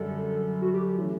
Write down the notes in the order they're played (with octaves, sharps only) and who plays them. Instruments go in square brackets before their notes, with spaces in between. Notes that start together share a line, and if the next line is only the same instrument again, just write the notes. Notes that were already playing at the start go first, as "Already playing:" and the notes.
Already playing: [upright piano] F#2 D3 G3 [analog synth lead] A4
[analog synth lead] F#4
G4
[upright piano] E3 A3 C#4